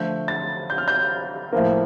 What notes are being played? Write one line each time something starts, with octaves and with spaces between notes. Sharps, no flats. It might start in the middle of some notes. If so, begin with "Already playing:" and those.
Already playing: D3 F3 A3 G6
A6
G6
F6
G6
A2 F3 A#3